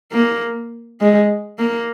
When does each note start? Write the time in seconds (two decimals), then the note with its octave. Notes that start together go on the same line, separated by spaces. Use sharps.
0.13 A#3
1.00 G#3
1.59 A#3